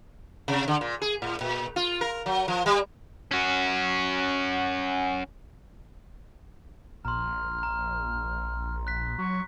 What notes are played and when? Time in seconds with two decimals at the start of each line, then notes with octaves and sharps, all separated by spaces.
0.48 C3
0.68 D3
0.81 A#2
1.02 G#4
1.22 A2
1.41 A#2
1.76 F4
2.01 A#4
2.26 F#3
2.48 F3
2.66 G3
3.32 C#4 F#4
7.05 A#1 A#5 C6 F6
7.63 A#5
8.87 F#6 B6
9.18 F#3 C#6